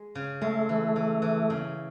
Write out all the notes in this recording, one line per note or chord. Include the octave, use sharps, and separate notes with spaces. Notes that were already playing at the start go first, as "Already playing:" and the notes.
Already playing: G#3
C#3
G#3 A3
E3
E3
E3
C#3